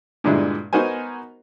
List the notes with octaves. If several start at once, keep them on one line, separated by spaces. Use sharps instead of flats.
G2 A#2 D3 G#3 D4 E4
B3 D#4 F#4 A#4 C5 G#5